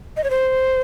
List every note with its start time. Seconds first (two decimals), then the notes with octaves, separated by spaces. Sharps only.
0.17 D#5
0.24 C#5
0.30 C5